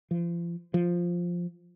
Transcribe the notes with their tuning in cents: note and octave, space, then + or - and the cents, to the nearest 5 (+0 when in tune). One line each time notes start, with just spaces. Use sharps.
F3 -35
F3 +0